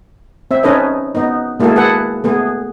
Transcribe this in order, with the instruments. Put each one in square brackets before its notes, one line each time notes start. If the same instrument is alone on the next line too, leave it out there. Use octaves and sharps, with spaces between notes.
[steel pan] C4 E5
C#4 D#4 A4 B4 D#5
B3 D#4
G#3 A#3 E4 F#4 G#4 A4
G#4 A4 B4 F#5
A3 B3 G#4